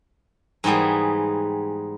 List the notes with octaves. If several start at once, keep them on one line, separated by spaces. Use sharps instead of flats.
G#2 E3 G3 B3 G#4